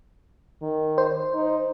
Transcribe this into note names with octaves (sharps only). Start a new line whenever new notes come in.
D#3
C5
D#4